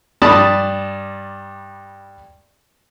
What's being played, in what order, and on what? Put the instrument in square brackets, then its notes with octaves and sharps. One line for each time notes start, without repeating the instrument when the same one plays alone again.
[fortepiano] G2 D5 A5 B5 D#6